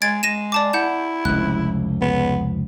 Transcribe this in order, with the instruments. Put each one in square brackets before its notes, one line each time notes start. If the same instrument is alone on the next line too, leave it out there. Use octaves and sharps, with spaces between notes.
[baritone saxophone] G#3 [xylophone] G#6 A6 D7
[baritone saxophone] G#3 [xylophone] A#6 D#7 E7
[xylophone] D5 A5 D6
[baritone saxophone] E4 [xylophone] F#5 G6 E7
[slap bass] F1 C#2 [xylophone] F#6
[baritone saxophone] B3